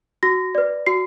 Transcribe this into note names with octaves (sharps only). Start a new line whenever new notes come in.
F#4 A#6
B4 D5
F#4 C7